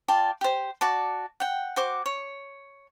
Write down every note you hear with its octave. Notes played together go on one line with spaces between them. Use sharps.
F4 D5 G5 A5
G4 C5
F#4 D5 A5
F#5 G5
F#4 C5 D6
C#5